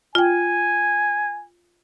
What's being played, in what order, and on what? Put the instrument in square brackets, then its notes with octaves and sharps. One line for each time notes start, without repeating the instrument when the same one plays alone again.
[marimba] F4 G5 [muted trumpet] G#5